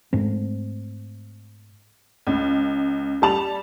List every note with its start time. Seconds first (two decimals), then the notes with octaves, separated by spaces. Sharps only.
0.13 G#2 A3 C4
2.27 C#2
3.22 G3 A5 F7